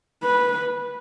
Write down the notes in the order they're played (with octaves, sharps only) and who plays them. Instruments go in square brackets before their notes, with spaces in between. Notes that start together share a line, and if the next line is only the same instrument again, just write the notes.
[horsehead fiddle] B4